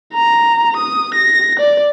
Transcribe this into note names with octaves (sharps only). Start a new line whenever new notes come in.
A#5
D#6
A#6
D5